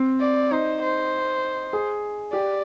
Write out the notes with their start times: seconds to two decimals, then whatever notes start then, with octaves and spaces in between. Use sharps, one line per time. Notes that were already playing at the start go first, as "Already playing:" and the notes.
Already playing: C4
0.21 D5
0.51 D#4 C5
0.82 C5
1.73 G#4
2.33 G4 D5